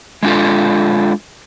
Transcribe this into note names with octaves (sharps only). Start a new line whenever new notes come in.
G#3 D4 F4 A4